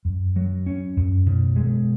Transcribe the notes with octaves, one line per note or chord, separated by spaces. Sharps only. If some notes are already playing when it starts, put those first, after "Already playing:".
F#2
F#3
C#4
F#2
B2
G#3